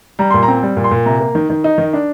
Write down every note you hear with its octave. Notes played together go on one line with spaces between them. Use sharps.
G3 A#5
A#2 C6
A#5
C4
G3
A#2
C6
A#2
C3 A#5
A#3
D#3
D#3
D#4
D#3
D4